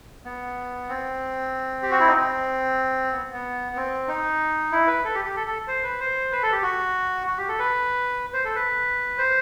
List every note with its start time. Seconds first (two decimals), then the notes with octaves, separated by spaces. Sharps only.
0.25 B3
0.89 C4
1.82 G4
1.91 F#4
2.00 E4
2.08 D#4
2.17 C4
3.12 B3
3.33 B3
3.76 C4
4.08 D#4
4.72 E4
4.87 B4
5.04 A4
5.15 G4
5.25 G4
5.36 A4
5.47 A4
5.67 C5
5.83 B4
6.00 C5
6.32 B4
6.42 A4
6.52 G4
6.63 F#4
7.27 F#4
7.38 G4
7.48 A4
7.59 B4
8.33 C5
8.45 A4
8.55 B4
9.18 C5